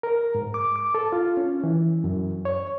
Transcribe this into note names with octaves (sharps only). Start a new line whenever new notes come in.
A#4
G#2
D6
D6
A4
F4
C#4
E3
F#2
C#5